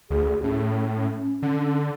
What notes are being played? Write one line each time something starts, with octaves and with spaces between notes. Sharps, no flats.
D2 G#4
A2 C#4
D3